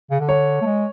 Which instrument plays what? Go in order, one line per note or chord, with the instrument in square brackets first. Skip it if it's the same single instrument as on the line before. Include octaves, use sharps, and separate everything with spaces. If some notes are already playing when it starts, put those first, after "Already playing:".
[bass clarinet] C#3
D3
[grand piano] C#5
[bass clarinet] A3
G#3